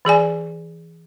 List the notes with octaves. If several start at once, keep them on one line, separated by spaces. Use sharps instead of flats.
E3 G#4 D5 G#5